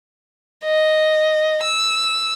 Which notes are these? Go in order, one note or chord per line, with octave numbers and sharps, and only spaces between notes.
D#5
E6